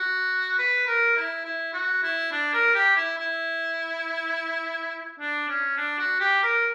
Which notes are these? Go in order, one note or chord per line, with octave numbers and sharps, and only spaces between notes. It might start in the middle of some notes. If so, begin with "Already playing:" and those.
Already playing: F#4
B4
A#4
E4
E4
F#4
E4
D4
A#4
G4
E4
E4
D4
C#4
D4
F#4
G4
A#4